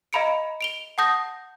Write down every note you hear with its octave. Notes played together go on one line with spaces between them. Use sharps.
D#5 F5 A#5 B5 C#7 D7
D7 F7 G7
F#5 A5 D#6 G6 A#6